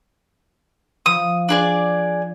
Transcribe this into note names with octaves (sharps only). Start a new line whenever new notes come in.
F3 D#6
D4 G#4 D5